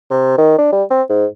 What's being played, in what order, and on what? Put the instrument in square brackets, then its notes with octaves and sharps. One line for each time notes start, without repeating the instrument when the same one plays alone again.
[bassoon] C3
D#3
D4
G3
C4
G#2